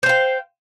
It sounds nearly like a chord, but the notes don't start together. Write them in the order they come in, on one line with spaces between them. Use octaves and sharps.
C5 F5 G5